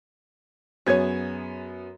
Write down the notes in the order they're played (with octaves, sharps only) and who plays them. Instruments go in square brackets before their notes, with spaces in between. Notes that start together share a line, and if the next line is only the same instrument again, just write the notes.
[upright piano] F#2 B3 G#6 [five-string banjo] G#4 C#5